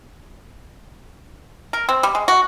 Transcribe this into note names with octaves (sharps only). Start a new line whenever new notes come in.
A#4
C4
G3
G#3
F#4